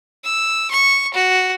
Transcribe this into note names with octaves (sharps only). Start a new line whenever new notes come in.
E6
C#6
F#4